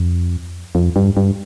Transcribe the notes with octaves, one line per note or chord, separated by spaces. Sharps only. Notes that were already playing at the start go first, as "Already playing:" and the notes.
Already playing: F2
F2
G2
G2